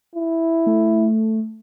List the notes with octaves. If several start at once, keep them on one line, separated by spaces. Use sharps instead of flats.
E4
A3